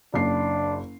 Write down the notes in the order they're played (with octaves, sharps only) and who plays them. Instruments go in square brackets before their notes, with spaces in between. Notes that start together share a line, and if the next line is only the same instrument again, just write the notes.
[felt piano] F#1 C7 [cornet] D4